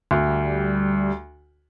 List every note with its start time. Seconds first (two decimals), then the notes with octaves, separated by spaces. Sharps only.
0.11 D2
0.27 G3